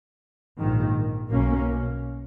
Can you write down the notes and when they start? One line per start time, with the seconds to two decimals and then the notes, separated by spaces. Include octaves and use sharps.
0.58 A#1 G#2 D#3
1.30 B1 B2 A#3 C#4